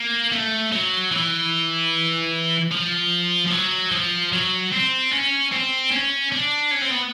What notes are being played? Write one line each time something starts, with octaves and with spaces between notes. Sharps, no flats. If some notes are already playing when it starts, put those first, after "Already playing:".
Already playing: A#3
A3
F#3
E3
F3
F3
F#3
F3
F#3
C4
C#4
C4
C#4
D4
C#4
C4
B3